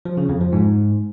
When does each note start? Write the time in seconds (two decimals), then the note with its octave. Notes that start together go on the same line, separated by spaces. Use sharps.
0.05 F3
0.17 C#3
0.29 F2
0.41 F3
0.52 G#2